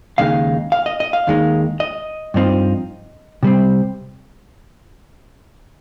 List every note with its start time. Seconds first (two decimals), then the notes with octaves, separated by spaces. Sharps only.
0.18 D#2 C#3 G#3 D#4 F5
0.72 F5
0.86 D#5
1.00 D#5
1.13 F5
1.27 D#2 D#3 G#3 D#4
1.80 D#5
2.34 G2 F3 C4 D#4
3.43 C3 G3 C4